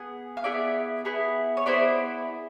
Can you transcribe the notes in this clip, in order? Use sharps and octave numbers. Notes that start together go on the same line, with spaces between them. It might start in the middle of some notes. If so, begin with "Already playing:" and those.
Already playing: B3 G#4
F5
B3 E4 G#4 D5 E5
B3 E4 G#4
C#5
B3 E4 G#4 C5 D5